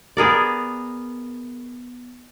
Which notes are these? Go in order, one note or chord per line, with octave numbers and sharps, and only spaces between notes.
B3 G#4 A#4 D5